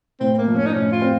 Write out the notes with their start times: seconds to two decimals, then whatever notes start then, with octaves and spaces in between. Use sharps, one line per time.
0.20 A2 C4
0.34 C4
0.38 A#3
0.47 F3
0.56 C#4
0.66 D#4
0.74 A2 C#4
0.92 F4
1.01 C4